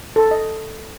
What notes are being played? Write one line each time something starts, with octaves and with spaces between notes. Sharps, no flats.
A4
D#5